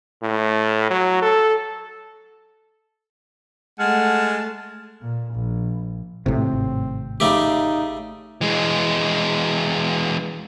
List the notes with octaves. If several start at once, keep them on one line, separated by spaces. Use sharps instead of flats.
A2
F#3
A4
G#3 A3 F#5 A5 F6
A#2
A#1
G#1 A2 C3 C4
C#3 A3 D#4 G4
E3 G#3